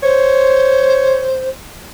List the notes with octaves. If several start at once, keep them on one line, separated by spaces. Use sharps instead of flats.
C5 C#5